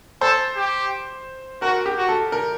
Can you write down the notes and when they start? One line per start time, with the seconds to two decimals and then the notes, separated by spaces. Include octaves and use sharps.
0.21 A4 C5
0.56 G4
1.62 F#4 A#4
1.86 G4
1.97 F#4
2.09 A4
2.32 A#4